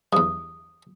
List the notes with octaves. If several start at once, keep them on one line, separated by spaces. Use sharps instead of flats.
E2 G2 D#6